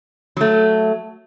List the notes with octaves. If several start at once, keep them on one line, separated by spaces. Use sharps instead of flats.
F#3 A3